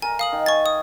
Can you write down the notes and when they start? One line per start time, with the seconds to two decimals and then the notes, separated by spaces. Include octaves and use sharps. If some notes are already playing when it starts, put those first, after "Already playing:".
0.02 A#4 G#5 A#5
0.19 F5 D#6 F#7
0.32 D#3
0.46 G#5 C#6 A6
0.66 D#6